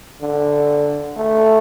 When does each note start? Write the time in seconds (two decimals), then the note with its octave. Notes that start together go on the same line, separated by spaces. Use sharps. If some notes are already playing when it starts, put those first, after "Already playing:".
0.21 D3
1.17 A3